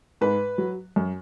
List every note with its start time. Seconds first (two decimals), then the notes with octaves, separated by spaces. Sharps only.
0.21 G#2 B4
0.58 F#3
0.96 F#2